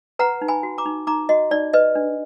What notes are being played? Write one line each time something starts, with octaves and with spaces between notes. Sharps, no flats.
B4 F#5 A#5
D#4
G#5 B5
F#4
A#5 D6
D#4
D#4 A#5 D6
F#4 D#5
D#4 D5
B4 D#5
D4